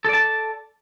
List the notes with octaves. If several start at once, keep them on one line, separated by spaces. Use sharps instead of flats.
A4 D5 A5